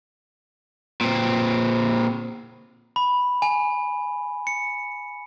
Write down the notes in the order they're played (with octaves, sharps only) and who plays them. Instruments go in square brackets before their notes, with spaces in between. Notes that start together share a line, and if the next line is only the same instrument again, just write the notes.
[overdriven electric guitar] A#2 C4
[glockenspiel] B5
G#5
C#7